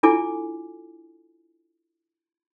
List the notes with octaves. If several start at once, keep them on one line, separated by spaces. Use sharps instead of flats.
D4 E4 F4 A4 G#5 D6